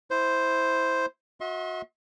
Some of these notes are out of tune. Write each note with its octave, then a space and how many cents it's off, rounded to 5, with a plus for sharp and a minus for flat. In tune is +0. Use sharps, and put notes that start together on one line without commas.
E4 -10 C5 +0
F#4 -25 E5 -45 C6 +30